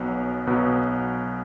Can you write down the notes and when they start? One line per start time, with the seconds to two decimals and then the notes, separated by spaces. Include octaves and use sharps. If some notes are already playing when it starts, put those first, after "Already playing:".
Already playing: B1 B2 F#3 B3
0.47 B1 B2 F#3 B3